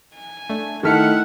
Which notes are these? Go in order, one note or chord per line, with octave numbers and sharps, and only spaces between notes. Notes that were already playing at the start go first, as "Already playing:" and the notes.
G#5
A3 D4
D#3 A3 E4 A4 F#5 F6 B6 C#7